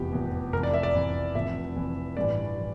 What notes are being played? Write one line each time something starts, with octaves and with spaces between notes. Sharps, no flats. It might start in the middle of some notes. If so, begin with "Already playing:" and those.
Already playing: F1 E2 E3 G4
F1 E2 E3
F1 F2 E3 A#4
D5
E5
D5
F1 F2 E3
F1 F2 E3 E5
F1 F2 E3
A1 G2 E3 D5
E3